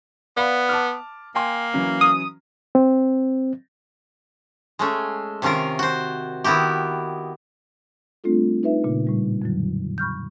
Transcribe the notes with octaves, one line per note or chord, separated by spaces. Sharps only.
B3 D5 F5 B5
A5 D6 F6
A#3 G5 G#5 C6
E3 F#3 C#4
D#6
C4
G#3 A3 C#4
C3 D#3 C#4 F4 A#4
F#4 C5
D#3 B3 E4 F#4 G4
G3 A3 C4 D4 F4 A4
D#4 B4 E5
A#2 C#3 A#3
A2 G3
F2 D3 F#3
B5 C#6 F6 G6